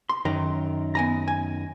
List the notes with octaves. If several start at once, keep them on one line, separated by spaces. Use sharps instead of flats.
C6
F#2 D#3 A#5
B3 G#5 A#5
G#5